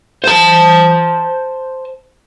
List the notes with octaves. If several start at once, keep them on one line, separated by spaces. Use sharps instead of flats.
C5 A5